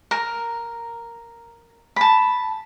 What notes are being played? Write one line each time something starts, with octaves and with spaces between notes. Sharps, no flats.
A#4
A5 B5